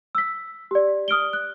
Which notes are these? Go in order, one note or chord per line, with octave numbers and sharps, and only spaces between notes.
E6 B6
G4 D5
D#6 F6 D7 G7
F#6